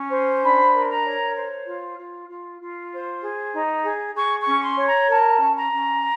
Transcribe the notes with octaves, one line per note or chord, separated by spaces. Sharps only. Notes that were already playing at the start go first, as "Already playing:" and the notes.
Already playing: C#4
C5
D4 B5
A#4
A#5
C#5
C5
F4
F4
F4
F4
C5
G#4
D#4
G#4
G#4 C#6
C#6
C#4
C6
C#5
A#5
A#4 A5
C#4
A#5
C#4